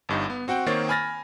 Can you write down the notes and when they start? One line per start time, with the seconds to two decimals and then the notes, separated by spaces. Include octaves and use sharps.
0.09 G1 G2 D#4
0.30 B3
0.48 C4 F#4 F#5 G5
0.66 D#3 A#3 C4 C5 C#5 A6
0.89 G#5 B5 F6 A6 A#6